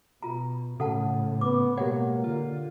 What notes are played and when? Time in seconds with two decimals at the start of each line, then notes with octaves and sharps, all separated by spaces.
0.23 B2 F4 A#5
0.80 A2 C#3 A4 F#5 A5
1.41 B3 D6
1.78 B2 G#3 A#3 F#4 G4 C#5 F#5
2.24 D3 F4